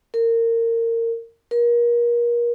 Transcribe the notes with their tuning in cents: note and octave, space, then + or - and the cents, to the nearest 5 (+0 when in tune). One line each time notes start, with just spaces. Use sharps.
A#4 -25
A#4 +30